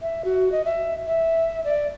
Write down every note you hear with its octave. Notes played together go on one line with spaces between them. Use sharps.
E5
F#4
D#5
E5
E5
D5